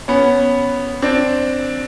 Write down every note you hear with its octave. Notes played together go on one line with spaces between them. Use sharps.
B3 C#4
C4 D4